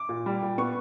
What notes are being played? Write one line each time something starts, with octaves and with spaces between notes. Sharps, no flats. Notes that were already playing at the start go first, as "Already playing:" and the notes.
Already playing: D6
A#2
G3
A#2
B3 C#6